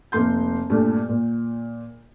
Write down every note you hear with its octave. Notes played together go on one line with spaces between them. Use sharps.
F1 A#3 C6 G6
G2 A#2 A3
A#2